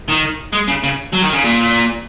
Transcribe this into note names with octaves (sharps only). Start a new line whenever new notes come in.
D#3
G#3
C#3
C#3
F#3
D#3
C#3
A#2